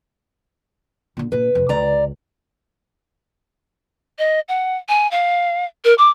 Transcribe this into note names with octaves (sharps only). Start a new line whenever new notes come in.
A#2 D3
A#2 D4 B4
F2 C3
C#2 D3 D5 A#5
D#5
F#5
G#5
F5
A#4
D6